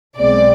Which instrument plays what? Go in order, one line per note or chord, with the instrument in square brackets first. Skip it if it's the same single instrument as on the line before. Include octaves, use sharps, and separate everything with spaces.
[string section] B1 B2 G#3 C4 D5